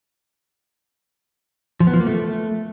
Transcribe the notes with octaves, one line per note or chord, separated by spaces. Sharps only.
F3
B3
F3
A#3
A3